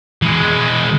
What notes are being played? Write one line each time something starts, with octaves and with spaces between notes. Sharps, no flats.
E3 G#3